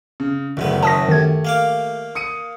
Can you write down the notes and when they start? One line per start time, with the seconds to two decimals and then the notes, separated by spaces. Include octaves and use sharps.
0.20 C#3
0.57 F#1 D2 G#2 D#3 B3
0.83 F#2 C#4 A5 D#6 A#6
1.09 D#3 A3 G4 G#6
1.45 A#3 F5 D6
2.15 D#6 C#7 D#7